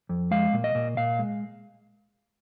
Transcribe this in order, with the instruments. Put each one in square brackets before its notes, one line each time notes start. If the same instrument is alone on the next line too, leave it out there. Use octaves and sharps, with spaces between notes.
[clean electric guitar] F2
G#3 F5
A#2
D#5
A#2
A#2 F5
G#3